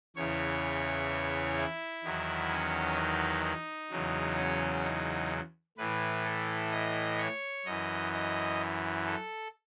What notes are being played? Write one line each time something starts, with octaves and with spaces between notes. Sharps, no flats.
E2 C#3 E3 C#5
E4
E2 D#3 F#3
C#4
D#4
D#4
E2 C#3 F#3
C#4
D#4
A2 E3 B4
A4
D#5
C#5
F#2 E3 D#5
D#5
A4